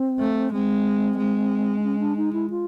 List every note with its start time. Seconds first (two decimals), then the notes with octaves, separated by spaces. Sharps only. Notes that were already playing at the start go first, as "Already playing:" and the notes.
Already playing: C4
0.20 A3
0.53 G#3 C4
1.18 G#3
1.79 D4
1.83 C#4
1.99 D4
2.17 D#4
2.33 E4
2.50 F4